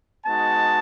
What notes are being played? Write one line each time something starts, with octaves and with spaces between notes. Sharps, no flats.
G#3 B3 D#4 F#4 A5